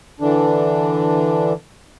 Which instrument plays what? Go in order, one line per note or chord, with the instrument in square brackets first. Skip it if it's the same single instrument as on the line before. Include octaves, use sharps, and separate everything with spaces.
[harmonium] D3 E3 D4